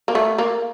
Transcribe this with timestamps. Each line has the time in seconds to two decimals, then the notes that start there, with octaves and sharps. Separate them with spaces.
0.08 A#3
0.15 A3
0.38 A#3